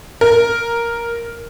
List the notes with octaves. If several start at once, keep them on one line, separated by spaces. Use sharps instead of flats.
A#4